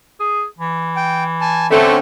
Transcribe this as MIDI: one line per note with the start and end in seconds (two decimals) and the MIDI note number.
0.20 0.45 68
0.58 1.90 52
0.96 1.24 79
1.41 1.67 80
1.41 1.67 81
1.71 1.98 50
1.71 1.98 57
1.71 1.98 60
1.71 1.98 61